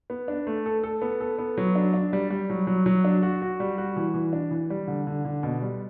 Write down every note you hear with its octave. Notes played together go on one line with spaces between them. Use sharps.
B3
D4
A3
A4
A4
B3
A4
B3
F#3
D4
D4
G3
G3
F#3
F#3
F#3
D4
F#4
F#4
G3
F#4
E3
E3
D4
E3
G3
D3
D3
D3
B2
G3